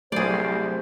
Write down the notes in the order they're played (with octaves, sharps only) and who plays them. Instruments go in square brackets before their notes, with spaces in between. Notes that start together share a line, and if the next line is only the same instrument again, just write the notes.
[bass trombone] C2 [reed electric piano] F#3 A3 [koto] G#4 D5 [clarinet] C5